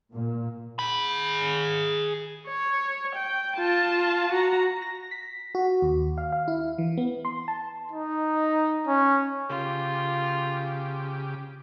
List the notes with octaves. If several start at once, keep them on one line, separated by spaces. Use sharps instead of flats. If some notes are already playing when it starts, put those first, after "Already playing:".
A#2
G#4 B5
C#5
G5
F4 A5
F#4 A#5
A#6
B6
F#4
D#2
F5
F5
E4
E3
B3
C6
A5
D#4
C#4
C#3 F4 G4